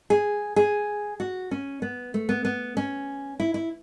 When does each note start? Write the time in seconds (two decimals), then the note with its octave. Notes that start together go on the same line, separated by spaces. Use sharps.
0.10 G#4
0.56 G#4
1.20 F#4
1.51 C#4
1.82 B3
2.14 A3
2.29 B3
2.45 B3
2.77 C#4
3.40 E4
3.54 E4